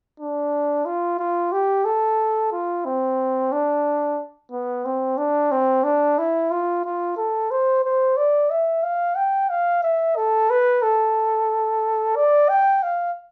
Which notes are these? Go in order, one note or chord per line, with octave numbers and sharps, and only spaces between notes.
D4
F4
F4
G4
A4
F4
C4
D4
B3
C4
D4
C4
D4
E4
F4
F4
A4
C5
C5
D5
E5
F5
G5
F5
E5
A4
B4
A4
D5
G5
F5